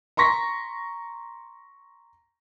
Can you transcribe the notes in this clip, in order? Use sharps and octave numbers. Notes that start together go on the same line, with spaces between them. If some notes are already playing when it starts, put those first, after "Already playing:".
A#5 C6 C#6 A#6 B6